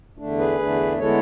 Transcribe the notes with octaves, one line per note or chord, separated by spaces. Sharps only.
E2 D3 A3 D4
G#4 B4
E2 D3 A3 D4
D3 G#3 B3 E4 A4 C#5